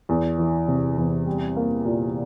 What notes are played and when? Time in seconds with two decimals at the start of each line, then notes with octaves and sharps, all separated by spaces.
0.09 E2
0.38 E3
0.68 C3
0.98 E2
1.26 G3
1.56 A#3
1.85 A#2